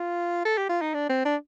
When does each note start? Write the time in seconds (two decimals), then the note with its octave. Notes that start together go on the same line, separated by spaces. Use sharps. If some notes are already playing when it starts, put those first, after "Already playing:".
Already playing: F4
0.45 A4
0.58 G4
0.69 F4
0.82 D#4
0.94 D4
1.09 C4
1.25 D4